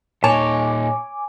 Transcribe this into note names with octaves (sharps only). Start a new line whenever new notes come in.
A#2 D#4 C#5 G#5 A5 D6